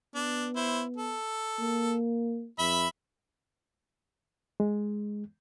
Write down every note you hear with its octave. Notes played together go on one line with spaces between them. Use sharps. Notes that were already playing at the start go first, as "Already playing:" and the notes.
B3 D4
E4 C5
A4
A#3
F2 E5 B5
G#3